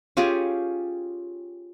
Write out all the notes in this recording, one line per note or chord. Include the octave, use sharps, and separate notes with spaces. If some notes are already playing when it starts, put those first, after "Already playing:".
C#4 F4 G4 G#4